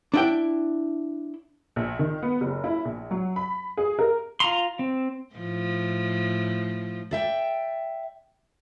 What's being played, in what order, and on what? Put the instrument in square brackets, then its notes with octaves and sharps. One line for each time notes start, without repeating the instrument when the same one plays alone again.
[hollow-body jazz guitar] D4 E4 G5
[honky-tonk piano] A#1
D#3
B3
F#1
E4
A#1
F#3
B5
G#4
A#4
[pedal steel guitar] F4 A#5 C6
C4
[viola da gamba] A2 F3
[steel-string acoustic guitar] D5 E5 G5